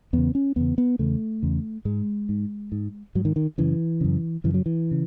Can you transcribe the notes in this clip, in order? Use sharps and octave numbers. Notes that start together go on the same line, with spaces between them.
E2 C#3 B3
C#4
E2 C#3 B3
B3
E2 C#3 A3
E2 C#3
G#2 G#3
G#2
G#2
G#2 F#3
D#3
D#3
F#2 C#3 E3
F#2 C#3
F#2 C#3 E3
F#3
E3
C#3